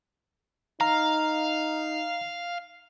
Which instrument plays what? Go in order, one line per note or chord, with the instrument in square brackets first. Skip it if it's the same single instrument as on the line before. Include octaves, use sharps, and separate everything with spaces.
[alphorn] D#4 [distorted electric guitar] F5 [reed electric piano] A#5